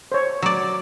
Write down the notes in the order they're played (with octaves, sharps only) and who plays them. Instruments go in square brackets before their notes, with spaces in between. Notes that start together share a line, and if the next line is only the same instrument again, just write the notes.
[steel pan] C5 C#5
[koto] F#3 D5